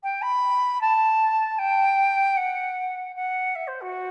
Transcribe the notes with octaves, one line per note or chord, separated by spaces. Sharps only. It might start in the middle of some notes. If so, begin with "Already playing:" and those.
G5
B5
A5
G5
F#5
F#5
E5
C5
F#4